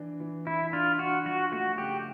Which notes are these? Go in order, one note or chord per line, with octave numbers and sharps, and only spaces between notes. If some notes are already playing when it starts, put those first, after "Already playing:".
Already playing: E3 D4
E3
E3 E4
D4 F4
D4 F#4
F3 F#4
A3 F#4
C#3 G4